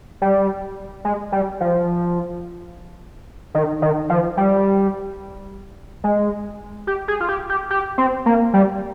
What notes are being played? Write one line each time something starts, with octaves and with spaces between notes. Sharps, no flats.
G3
G#3
G3
F3
D#3
D#3
F3
G3
G#3
G4
G#4
F4
G4
G4
G4
C4
A#3
G3